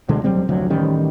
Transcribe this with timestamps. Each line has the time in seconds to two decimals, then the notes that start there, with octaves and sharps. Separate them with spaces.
0.09 D2 B2 D3 G#3
0.24 E1 F#3 G3 C4
0.49 F1 D2 F#3
0.70 A1 D#3 G3 C#4